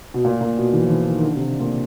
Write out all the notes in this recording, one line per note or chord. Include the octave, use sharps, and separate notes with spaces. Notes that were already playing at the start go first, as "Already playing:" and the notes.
B2
A#2
A#2
B2
E3
F3
E3
D#3
D#3
D3
C3
A#2